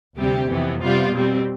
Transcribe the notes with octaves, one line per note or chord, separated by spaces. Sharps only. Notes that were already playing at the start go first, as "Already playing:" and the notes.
D2 C3 G3 C4 G4
F2 C3 E3 B3
C3 G3 B3 F4
B2 G3 C4